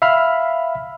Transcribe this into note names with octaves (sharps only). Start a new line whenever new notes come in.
E5 F5 B5 F6